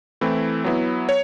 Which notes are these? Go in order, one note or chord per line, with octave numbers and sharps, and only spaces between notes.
E3 A3 C4 E4
F#3 B3 E4
C#5